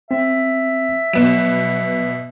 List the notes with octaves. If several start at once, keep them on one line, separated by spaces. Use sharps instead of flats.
C4 E5
B2 F#3 B3 E7